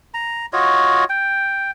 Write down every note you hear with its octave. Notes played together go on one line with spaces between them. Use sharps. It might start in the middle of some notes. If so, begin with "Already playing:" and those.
A#5
F4 F#4 C#5 D#5
G5